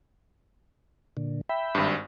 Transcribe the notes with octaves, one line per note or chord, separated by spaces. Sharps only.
A#2 D3
E5 G5 B5
G#1 G2